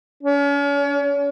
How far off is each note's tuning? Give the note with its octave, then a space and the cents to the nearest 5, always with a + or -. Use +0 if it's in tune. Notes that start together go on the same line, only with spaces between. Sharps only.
C#4 +40